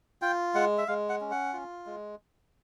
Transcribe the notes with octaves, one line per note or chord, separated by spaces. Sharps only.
F4 G5
G#3 F#5
E5
G#3 F5
F#5
C#4
F#5
F4
G#3